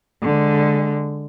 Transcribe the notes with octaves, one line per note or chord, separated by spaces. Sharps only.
D3 G#3